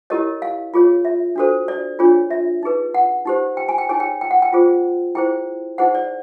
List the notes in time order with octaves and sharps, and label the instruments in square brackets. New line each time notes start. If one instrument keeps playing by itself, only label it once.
[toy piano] E4 G4 A#4 C#5 D#5
F5
F4 G#4 C#5
E5
D4 F#4 A4 C5
D5
D4 F4 G#4 C#5
E5
D#4 G#4 B4
F#5
D#4 G4 C5
G5
G#5
G5
D#4 G#4 C#5 G#5
G5
G5
F#5
G5
F4 G#4 C5
E4 G#4 C5 G5
D#4 G#4 C5 F#5
D5